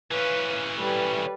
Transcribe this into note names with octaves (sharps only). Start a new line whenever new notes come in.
E3 C#4 B4 F5
G3 A4 B4